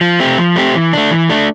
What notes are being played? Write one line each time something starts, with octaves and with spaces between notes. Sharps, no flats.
F3
A3 C4 G4
F3
A3 C4 G4
E3
A3 D4
E3
A3 D4